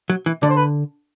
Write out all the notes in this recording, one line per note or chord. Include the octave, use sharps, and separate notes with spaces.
F#3
E3
D3 D5
C5
B4